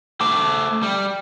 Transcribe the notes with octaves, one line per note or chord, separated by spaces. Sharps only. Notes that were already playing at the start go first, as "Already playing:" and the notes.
A3 C5 D6
G3